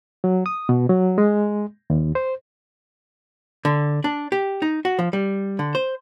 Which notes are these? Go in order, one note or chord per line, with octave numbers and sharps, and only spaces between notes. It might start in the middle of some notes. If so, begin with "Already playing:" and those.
F#3
D#6
B2
F#3
G#3
D#2
C5
D3
D4
G4
D#4
F#4
F3
G3
D3
C5